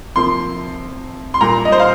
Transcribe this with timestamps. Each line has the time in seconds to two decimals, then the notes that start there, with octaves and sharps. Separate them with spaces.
0.15 C3 F3 A#3 C6
1.34 C6
1.41 A#2 G3 A#3 A#5
1.65 D#5
1.72 C5
1.79 F5